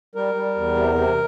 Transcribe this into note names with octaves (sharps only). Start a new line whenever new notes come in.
G3 A#4
G3
E2
C3
C3